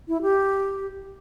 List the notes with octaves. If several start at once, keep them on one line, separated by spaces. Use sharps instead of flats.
E4
G4